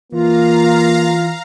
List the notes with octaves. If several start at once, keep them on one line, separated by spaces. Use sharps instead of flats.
E3 A#3 F4 F5 A#5